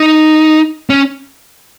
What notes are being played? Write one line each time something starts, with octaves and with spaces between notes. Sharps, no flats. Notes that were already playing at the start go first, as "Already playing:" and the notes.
Already playing: D#4
C#4